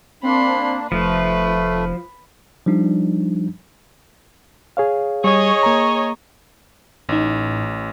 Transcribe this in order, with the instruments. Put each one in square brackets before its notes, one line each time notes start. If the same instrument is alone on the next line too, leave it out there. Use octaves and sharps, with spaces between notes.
[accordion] A#3 D4 [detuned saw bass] C4 [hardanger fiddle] B5 C6
[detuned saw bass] F1 [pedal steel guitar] F3 [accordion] A3 [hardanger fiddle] B4
[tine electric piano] F3 G3 D4 D#4
[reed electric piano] G#4 C#5 F5
[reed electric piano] G3 [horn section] G#4 C#5 D#5
[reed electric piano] A#3 A#5
[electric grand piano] A1 [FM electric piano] A2 D#4